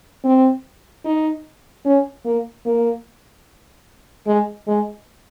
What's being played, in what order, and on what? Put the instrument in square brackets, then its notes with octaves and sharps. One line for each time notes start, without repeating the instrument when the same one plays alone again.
[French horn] C4
D#4
C#4
A#3
A#3
G#3
G#3